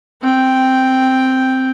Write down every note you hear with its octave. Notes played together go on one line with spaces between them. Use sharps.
C4 G5